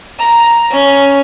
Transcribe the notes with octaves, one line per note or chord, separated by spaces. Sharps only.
A#5
C#4